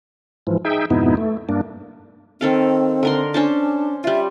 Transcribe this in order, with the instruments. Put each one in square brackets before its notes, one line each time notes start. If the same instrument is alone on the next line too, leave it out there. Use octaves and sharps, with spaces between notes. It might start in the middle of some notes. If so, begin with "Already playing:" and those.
[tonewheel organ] G#2 E3 F3
D#4 G#4 E5 G5
F2 G#2 B2 B3 D#4 E4
A3
G2 A#3 D4
[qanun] D#3 A4 F5 [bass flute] C4
[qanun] D3 A#4 C6
[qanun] C#4 C5 A5 [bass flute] D4
[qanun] G3 F4 [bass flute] E5